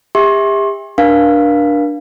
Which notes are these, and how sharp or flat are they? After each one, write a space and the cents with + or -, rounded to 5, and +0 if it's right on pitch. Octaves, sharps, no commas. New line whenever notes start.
G4 +40 E5 -20 C6 +40
D4 +0 A#4 +40 F5 +0